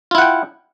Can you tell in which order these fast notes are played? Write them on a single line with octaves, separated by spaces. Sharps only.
F4 E4 F#5 G5